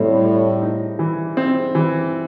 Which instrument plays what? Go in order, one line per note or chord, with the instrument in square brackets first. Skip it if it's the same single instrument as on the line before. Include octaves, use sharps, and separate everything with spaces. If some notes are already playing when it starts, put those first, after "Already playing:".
Already playing: [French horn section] A2 [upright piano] G3 C4
[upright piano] G3
D#4
E3
C4
E3